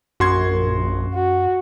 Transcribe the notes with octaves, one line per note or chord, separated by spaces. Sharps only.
A#1 F#2 F#4 C6 G#6
F#4